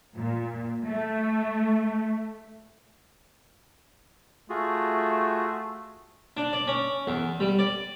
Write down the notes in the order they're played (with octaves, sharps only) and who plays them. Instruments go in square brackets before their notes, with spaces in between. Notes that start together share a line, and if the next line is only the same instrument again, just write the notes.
[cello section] A#2
A3
[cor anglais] A3 [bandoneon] F4 F#4 G#4
[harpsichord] D4
D5
C#4
E2
G3
D5